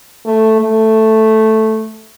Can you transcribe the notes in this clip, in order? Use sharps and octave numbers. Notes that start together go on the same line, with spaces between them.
A3
A3